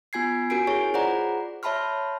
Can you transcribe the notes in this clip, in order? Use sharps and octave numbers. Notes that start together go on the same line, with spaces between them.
B3 F4 G#5 G#6 C7
C#4 F#4 A#4 G#5 C7 D7
E4 G#4 C#5 C#6
F4 G#4 C5 D5 F#5 A#5
C#5 E5 A5 B5 C6 F6